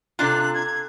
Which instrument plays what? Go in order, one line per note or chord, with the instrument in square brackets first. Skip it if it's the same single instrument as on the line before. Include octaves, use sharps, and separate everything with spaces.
[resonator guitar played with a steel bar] C3 D4 F4 [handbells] A4 A#5 [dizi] F#6
[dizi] G#6